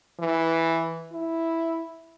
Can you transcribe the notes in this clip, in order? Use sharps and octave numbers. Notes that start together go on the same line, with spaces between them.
E3
E4